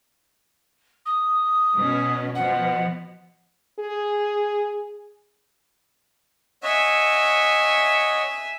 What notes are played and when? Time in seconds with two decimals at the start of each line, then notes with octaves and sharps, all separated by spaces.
1.05 D#6
1.75 B2 C#4
2.35 B2 F3 F#5
3.79 G#4
6.63 C#5 D#5 E5 F#5 G#5